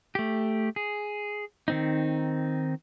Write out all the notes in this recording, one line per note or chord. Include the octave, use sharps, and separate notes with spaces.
A3 G4
G#4
D#3 C4 D#4